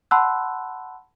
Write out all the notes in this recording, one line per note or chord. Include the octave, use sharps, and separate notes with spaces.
F#5 A5 B5 C6 E6 F#6